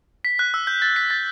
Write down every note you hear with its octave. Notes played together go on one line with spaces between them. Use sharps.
B6
F#6
E6
G6
A6
B6
A6